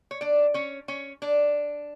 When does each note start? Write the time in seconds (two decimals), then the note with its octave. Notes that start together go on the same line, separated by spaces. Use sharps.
0.11 C#5
0.21 D4 D5
0.54 C#4 C#5
0.88 C#4 C#5
1.22 D4 D5